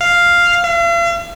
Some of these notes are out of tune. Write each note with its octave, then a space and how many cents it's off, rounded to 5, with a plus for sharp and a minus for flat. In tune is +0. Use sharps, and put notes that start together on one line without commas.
F5 +0
F5 -45